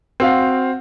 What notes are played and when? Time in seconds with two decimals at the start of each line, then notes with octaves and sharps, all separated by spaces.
0.20 C4 F#4 F5